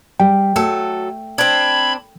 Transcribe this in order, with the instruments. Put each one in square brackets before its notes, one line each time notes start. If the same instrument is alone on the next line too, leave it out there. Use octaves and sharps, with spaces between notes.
[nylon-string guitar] G3 [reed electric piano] G5
[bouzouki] F#3 A4 [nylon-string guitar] A3
[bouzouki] C4 D4 [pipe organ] B5 G#6